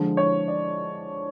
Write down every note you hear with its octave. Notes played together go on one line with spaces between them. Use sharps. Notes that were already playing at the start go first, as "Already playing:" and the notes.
Already playing: D3 F3 G#3
C#5
D5